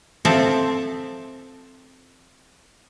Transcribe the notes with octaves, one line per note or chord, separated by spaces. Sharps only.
F3 C4 A4 E5